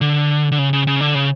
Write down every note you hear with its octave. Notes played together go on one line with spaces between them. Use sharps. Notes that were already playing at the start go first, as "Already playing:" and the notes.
D3
D3
C#3
C#3
C#3
D3
C#3